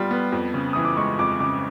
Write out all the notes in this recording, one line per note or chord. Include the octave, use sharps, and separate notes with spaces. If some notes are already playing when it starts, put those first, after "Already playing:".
Already playing: G3 B3 F4 C6
B3
F2
C#3
E3 D#6
D6
G#3 C#6
F2 D6
C#3 D6